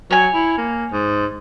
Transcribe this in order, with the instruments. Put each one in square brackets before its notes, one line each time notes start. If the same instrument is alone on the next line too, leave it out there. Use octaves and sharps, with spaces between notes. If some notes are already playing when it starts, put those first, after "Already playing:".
[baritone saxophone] F#3 [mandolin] C#5 G#5
[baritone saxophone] E4
A#3
G#2